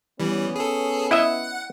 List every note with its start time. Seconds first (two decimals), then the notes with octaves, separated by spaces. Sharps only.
0.20 E3 G3 B3 C#4
0.56 G#4 A4
1.11 E4 D#5 E5 F#5